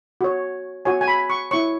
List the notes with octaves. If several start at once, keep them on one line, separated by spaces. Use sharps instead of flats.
F#4 C#5
F#4 C#5 G#5
G#5
B5
C#6
E4 C#5 C#6